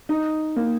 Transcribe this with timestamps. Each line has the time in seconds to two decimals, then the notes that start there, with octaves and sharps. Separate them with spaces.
0.09 D#4
0.56 A#3